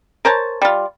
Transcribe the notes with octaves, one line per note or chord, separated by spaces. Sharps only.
A#4 C5 C#5 A5
G3 F4